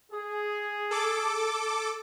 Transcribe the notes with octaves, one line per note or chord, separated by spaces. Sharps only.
G#4
A4 D6